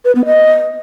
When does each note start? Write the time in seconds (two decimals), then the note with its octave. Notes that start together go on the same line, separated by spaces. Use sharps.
0.05 B4
0.15 B3
0.26 D#5